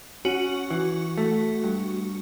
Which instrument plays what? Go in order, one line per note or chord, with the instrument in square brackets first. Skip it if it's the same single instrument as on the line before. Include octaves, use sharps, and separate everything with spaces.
[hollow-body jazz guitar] C#4 [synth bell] F#4
[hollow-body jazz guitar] E3
A3
G2